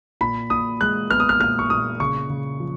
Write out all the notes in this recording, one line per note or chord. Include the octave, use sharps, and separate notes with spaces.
A#2 B5
A#2 D#6
G#3 F#6
B3 F6
D#6
F6
A#2 F6
C#6
A#2 D#6
C#3 C#6
C#3
F3